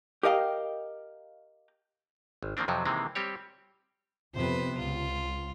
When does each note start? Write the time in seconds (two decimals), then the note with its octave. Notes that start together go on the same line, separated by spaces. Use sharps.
0.23 G4 A#4 D#5 F5 G5
2.43 G#1
2.57 D#3 F3 A#3 C4 D4
2.68 F2 C3 F3 F#3
2.85 C3 D#3 E3 G#3 A#3 C4
3.15 G3 C4 G4 C#5
4.35 F2 C3 B3 B4 C5
4.78 C#2 F4